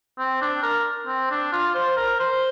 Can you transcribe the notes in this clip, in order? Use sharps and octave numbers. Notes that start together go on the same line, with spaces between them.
C4
D4
A#4
C4
D4
F4
C5
A#4
C5